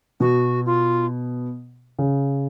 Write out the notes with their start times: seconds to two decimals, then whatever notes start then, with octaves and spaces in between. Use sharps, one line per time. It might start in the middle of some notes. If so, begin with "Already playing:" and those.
0.20 B2 F#4
0.65 F4
1.99 C#3